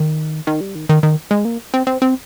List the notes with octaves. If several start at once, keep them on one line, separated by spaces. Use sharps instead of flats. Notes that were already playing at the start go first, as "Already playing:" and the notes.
Already playing: D#3
D#3
G3
D#3
D#3
D#3
G#3
A#3
C4
C4
C4